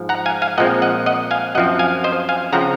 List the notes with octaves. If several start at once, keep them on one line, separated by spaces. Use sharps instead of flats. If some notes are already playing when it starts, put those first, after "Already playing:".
Already playing: G#2 F3
F#5 A#5
F5 G#5
F5 G#5
A#2 F3 G#3 C4 D#5 F#5
D#5 F#5
D#5 F#5
F5 G#5
F#2 F3 C4 D#5 F#5
F5 G#5
C5 D#5
F5 G#5
C#3 F3 C4 F#5 A#5